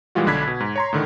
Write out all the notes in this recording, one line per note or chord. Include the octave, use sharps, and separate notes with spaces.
A#2 E3 G3 G#3 F4 F#4
B1 D3 D4 B5 G#6 B6
B2
G#2
C#5 A#5 C6
A2 D3 D#3